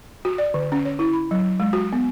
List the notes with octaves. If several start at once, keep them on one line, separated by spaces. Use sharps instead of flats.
F#4
D5
D3
C#4
C#5
E4
B5
F#3
G#3
F#4
B3